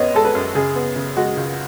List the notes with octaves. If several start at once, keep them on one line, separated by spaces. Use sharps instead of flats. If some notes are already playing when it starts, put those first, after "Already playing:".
Already playing: F#2 B3 B4 C#5 D#5
G#3 A4
B4
F#2
C#3 G#4
B3
C#3
G#3 F#4
C#2